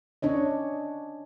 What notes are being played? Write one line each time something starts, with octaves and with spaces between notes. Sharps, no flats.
C#4 D4 C#5 D#5